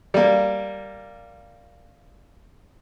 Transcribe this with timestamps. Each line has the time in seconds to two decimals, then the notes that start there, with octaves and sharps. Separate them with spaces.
0.14 G3 A#3